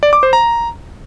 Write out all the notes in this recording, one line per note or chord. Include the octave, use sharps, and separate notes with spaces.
D5
D6
C5
A#5